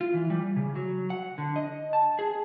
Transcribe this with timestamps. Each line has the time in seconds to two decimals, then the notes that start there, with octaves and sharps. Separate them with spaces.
0.01 F4
0.14 E3
0.30 G3
0.56 C#3
0.76 F#3
1.10 F#5
1.38 D3
1.56 D#5
1.93 A5
2.19 G#4